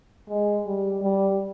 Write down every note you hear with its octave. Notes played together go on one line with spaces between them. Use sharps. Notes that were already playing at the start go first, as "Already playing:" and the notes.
G#3
G3
G3